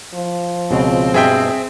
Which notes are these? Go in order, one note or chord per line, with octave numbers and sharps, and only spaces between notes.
F3
C#2 B2 C4
G2 B2 G#3 G#4 E5 G5